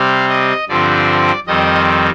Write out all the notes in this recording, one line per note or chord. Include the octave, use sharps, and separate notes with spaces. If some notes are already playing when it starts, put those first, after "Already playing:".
Already playing: C3 G3 C4 F5
D#5
G2 D3 F3 C4 D5
F2 D#3 G3 C4 D#5